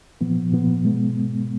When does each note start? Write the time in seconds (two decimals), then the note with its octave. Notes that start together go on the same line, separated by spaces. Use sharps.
0.21 A#2 F3 B3
0.52 A#2 F3 B3
0.83 B2 G#3 B3